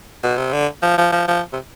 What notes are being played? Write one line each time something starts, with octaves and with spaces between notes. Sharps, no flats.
B2
C3
D3
F3
F3
F3
F3
C3